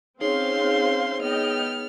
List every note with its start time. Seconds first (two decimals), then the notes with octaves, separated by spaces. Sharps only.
0.21 C4 C#4 D#4 G#4 C5 C#5 F5 C6
1.21 B3 D#5 G5 F6